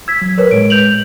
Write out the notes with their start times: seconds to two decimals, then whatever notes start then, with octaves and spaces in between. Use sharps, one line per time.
0.08 E6 G#6 B6
0.22 F#3
0.38 A#4 B4 C#5
0.51 A2 G#3 D7
0.70 G6 F7 F#7